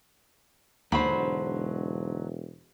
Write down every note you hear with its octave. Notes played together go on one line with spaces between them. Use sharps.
E1 D#2 G#2 D3 F#3 C5 B5